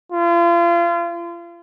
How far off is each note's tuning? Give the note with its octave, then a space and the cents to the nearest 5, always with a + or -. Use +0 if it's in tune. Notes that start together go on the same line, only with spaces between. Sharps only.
F4 -35